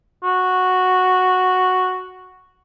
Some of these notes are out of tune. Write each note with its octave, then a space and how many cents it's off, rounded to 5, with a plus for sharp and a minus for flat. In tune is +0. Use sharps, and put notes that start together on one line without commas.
F#4 -5